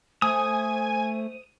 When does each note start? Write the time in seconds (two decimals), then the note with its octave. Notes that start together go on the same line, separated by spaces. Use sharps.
0.22 A3 C5 G#5 D#6